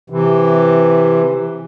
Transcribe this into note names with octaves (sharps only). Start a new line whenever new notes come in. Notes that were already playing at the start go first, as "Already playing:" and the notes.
C3 E3